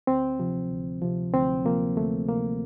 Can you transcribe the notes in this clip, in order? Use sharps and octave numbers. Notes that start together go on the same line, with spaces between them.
D2 C4
C3 F3
D2
C3 F3
D2 C4
C3 F3 A#3
D2 A3
C3 F3 A#3